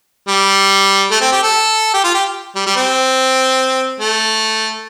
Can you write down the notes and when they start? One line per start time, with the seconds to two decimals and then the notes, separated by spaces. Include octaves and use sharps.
0.28 G3
1.11 A3
1.21 C4
1.32 G4
1.43 A4
1.94 G4
2.04 F4
2.14 G4
2.56 G3
2.66 G3
2.76 C4
4.00 A3